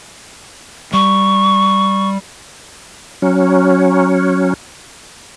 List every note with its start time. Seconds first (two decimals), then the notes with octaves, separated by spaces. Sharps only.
0.93 G3 C#6
3.22 F#3 C#4